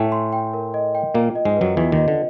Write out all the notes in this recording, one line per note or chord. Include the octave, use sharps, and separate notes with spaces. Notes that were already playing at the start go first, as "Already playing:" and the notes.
Already playing: A2 A3 G5 G#5
C6
G5
A#4
D#5
G5
A#2 A#3 F4
D#5
G#2 G#3
F#2 F#3 B4
E2 E3 F4
D#2 D#3
D#5
D3